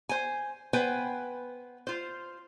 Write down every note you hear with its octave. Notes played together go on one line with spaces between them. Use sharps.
C5 G#5
B3 B4 C5 G5 G#5
F4 C5